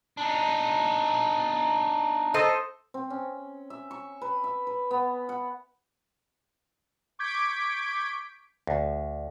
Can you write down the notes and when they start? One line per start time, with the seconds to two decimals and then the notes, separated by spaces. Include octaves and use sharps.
0.17 D4 D#4
2.34 A4 C5 D#5
2.94 C4
3.10 C#4
3.70 E5
3.91 C#6
4.22 B4
4.44 E5
4.67 B4
4.91 B3
5.29 F#5
7.19 C#6 D6 G6 G#6 B6 D7
8.67 D2